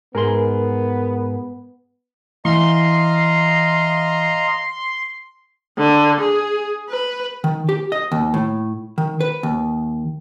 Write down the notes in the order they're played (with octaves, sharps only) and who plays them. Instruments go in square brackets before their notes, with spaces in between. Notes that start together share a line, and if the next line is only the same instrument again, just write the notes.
[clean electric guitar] G#2 G#4 C6 [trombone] B3 [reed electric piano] A#4
[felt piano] E3 [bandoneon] D#5 F5 A#5 [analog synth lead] C6
[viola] D3
G#4
B4
[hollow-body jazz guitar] D#3
G4
D#5
D#2
A2
D#3
B4
D#2